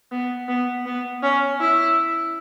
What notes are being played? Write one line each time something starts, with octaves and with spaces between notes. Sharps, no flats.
B3
B3
B3
C#4
E4